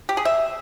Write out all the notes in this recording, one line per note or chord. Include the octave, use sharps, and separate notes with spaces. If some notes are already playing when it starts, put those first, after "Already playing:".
G4
G#4
E5